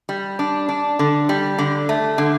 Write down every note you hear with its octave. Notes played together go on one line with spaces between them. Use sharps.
G3
D4
D4
D3
G3
D3
A3
D3